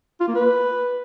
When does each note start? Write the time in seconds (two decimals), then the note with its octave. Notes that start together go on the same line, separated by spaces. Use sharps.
0.21 F4
0.28 A#3
0.35 B4